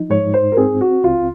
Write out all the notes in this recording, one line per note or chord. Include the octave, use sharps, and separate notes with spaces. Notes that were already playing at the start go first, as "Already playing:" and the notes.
Already playing: F3 D#4
G#2 C#5
C5
A#4
C4 G#4
F#4
C#2 F4